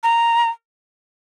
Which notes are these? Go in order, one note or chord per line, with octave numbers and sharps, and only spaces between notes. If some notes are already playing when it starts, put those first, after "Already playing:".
A#5